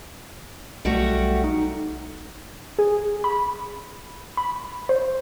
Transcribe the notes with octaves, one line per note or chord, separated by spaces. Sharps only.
B1 G3 A3 F#4
D#4
G#4
B5
B5
C5